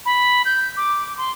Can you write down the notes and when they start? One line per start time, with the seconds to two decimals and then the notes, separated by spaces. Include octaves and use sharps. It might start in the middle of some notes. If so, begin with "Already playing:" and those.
0.06 B5
0.45 G6
0.77 D6
1.18 C6